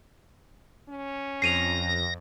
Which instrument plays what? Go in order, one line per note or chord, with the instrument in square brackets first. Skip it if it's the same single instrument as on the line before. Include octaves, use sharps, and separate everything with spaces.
[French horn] C#4
[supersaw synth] F2 [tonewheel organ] A#6 [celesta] C7 D#7 F7